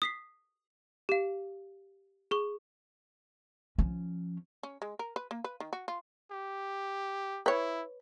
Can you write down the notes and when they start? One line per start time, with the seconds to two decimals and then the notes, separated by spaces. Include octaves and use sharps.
0.02 D#6 B6 C7
1.09 G4 F5
2.31 G#4 C#6
3.78 F3 C#4
4.63 C#4
4.82 G#3
4.99 A#4
5.16 B4
5.31 A#3
5.44 B4
5.60 D#3
5.73 F#4
5.88 F4
6.31 G4
7.46 E4 B4 C#5